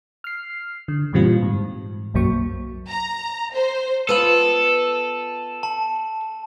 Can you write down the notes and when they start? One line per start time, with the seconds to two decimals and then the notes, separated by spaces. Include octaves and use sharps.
0.24 F6 C7
0.88 D3
1.13 F#2 A#2 E3 G3 C4 F4
1.42 G#2
2.14 B1 F#2 F#3 A#3 C#6
2.90 A#5
3.54 C5
4.09 B3 F4 A4 D#7 E7 F#7
5.63 A5